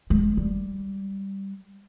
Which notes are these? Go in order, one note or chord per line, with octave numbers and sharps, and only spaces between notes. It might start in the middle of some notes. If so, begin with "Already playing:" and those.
G#3
G3